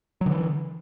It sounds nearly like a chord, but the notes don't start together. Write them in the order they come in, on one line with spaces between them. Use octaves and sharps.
F#3 D3 E3